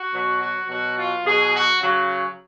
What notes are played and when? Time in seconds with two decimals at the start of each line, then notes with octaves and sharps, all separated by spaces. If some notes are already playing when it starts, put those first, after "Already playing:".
Already playing: F#4
0.13 B2 F#3
0.41 F#4
0.69 B2 F#3 F#4
0.97 F4
1.25 B2 F#3 G#4
1.54 F#4
1.81 C#3 F#3